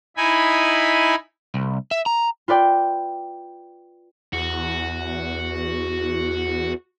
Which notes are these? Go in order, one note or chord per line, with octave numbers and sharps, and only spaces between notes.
D#4 E4 G#5 B5
C2
E5
A#5
F4 B4 D5 G5
E2 F#4